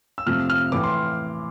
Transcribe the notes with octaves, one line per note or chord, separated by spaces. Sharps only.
E6
F2 C3 F3 A3 F6
F6
A2 E3 A3 D6
C6